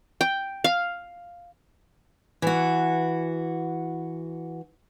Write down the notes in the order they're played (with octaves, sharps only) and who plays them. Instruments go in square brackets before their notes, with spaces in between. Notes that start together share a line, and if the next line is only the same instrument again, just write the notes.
[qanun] G5
F5
[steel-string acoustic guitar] E3 F#4